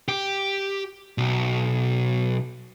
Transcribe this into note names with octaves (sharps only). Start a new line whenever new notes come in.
G4
B1